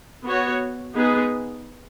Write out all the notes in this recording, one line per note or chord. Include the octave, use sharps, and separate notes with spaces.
B3 F#4 C#5
G#3 B3 D#4 G#4 B4